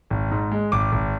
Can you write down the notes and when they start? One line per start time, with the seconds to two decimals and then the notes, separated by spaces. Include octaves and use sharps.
0.10 G#1
0.31 G#2
0.51 G#3
0.72 G#1 D6
0.92 G#1